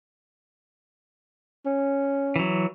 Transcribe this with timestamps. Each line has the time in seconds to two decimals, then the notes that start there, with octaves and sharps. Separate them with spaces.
1.66 C#4
2.36 E3 F#3